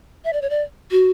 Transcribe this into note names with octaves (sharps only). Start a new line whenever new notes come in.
E5
D5
C#5
D5
F#4